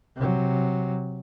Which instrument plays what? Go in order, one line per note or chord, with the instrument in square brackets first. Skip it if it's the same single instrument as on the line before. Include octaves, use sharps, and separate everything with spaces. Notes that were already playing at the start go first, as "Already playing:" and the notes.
[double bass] C3 F#3